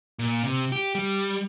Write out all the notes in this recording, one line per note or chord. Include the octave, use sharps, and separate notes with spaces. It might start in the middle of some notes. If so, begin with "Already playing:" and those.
A#2
C3
G4
G3